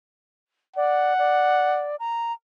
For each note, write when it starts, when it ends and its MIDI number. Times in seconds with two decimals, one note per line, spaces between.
0.76 1.13 74
0.76 1.89 78
1.18 1.96 74
1.99 2.32 82